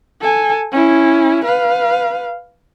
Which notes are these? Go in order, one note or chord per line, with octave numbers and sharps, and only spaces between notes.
A4 G#5
C#4 E4
B4 F5